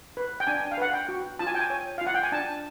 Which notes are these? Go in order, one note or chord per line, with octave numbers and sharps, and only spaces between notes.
B4
G5
D4 G#5
F5
B4 F#5
G5
F#4
F4 A5
G#5
G5
G#5
C#5
F4 F5
F#5
G5
G#5
D4 A5